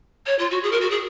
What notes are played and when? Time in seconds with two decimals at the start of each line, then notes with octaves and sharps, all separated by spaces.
0.26 C#5
0.39 F4
0.51 F#4
0.63 G#4
0.72 A#4
0.81 F#4
0.91 G#4